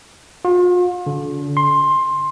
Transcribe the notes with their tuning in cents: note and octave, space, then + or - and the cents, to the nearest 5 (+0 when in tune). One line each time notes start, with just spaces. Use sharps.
F4 +40
D3 -35
C6 +15